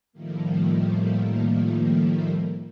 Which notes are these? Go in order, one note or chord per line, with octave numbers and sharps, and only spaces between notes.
A2 D#3 F3 G3 A3 A#3